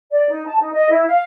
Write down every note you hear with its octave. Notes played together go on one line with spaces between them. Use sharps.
D5
D#4
A5
D#4
D#5
E4
F5